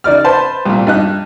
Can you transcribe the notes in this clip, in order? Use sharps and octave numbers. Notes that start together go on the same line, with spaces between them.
C#3 D#4 D5 F6
B4 C5 A5 C6
C2 A#2
G2 D#4 F#6